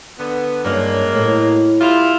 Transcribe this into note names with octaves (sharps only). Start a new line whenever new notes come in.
D3 B3
G2 F#3 G#3 A#3 C#4
A2
G3 E4 F4